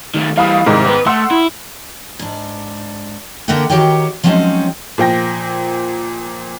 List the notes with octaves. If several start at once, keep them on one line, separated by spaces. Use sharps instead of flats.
D#3 A3
E3 G3 F5 B5 D#6
C2 G#2 D#3 G#3
B3 B4
A3 F#5 C6 E6
E4
G#2 D4
D3 A#3 A#4 E5 F#5 G5
D#3 F#4 G4 A#4 C#5 G5
F3 F#3 G#3 C4 C#4 D#4
A#2 F3 G5 A#6